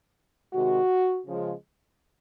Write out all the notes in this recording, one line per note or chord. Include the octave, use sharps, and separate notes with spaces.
C3 D#3 G#3 F#4
C#3 F3 G#3